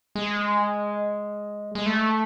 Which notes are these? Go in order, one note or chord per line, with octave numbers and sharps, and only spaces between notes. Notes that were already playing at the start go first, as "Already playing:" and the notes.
G#3
G#3
A3